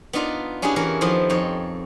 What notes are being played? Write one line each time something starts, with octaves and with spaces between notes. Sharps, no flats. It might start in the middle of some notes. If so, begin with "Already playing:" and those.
B3 D4 D#4 F4 D5
C#4 D4 E4 G4 G#4 B4
E3 C#4 E4 A#4
D#3 F3 B3 E4 A4 C5
F2 D#4 C#5 G5 C6